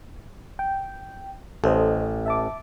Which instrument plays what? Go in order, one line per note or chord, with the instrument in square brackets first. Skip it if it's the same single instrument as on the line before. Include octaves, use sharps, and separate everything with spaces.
[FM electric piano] G5
[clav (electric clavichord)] A1 [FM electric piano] A4 C5 D#5
[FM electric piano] E5 A5 D6